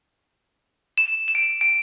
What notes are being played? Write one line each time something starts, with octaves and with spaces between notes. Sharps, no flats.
E7
E7
D7
D7